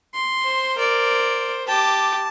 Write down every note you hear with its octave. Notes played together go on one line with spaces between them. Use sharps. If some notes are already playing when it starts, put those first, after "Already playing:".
C6
C5
A#4 D5
G4 A5 D6